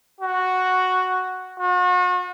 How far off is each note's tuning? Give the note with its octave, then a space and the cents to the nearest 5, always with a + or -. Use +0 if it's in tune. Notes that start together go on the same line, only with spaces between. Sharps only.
F#4 +0
F#4 -40